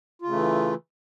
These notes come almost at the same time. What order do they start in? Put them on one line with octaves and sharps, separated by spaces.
F4 C#3 A3 E3